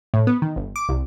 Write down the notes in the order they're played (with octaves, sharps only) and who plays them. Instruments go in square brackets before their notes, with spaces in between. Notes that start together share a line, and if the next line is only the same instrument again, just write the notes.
[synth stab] A2
B3
D#3
G1
D6
C2